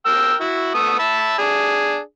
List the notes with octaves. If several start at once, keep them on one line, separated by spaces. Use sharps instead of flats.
A#4 G5 E6
E4 F#4
A3 B3 D#6
E5 A5 B5
D4 G#4